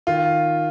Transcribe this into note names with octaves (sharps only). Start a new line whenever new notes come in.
D#3 F4